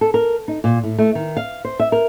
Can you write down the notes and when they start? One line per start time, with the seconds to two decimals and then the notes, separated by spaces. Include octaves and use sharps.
0.01 A4
0.14 A#4
0.48 D#4
0.64 A#2
0.83 A2
0.98 A3
1.15 D#3
1.37 F5
1.65 C5
1.80 E5
1.92 A#4